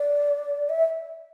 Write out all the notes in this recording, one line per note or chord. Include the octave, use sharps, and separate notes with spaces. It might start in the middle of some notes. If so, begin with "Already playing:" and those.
Already playing: D5
E5